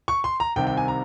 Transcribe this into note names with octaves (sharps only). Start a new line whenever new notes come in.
C#6
C6
A#5
C2 C3 D#3 G5
G5
G#5
A#5